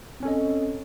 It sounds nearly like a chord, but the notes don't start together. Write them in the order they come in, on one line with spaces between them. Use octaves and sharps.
C4 C#4 A4 D#5